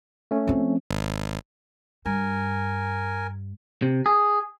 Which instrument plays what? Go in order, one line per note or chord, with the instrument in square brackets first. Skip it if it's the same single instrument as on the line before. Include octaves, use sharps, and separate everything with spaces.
[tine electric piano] A3 C#4
[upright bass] F3 C4
[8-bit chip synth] G#1
[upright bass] G2 [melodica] A#4 G#5
[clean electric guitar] C3
G#4